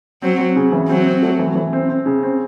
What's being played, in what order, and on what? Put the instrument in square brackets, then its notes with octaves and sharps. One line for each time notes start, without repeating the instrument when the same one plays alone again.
[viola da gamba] F#3 [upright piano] C4
[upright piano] C4
C#3
E3
[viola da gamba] F#3 [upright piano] C4
[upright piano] C4
A3
E3
E3
C4
C4
C#3
C4